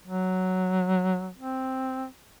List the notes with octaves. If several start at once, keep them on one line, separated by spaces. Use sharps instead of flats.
F#3
C4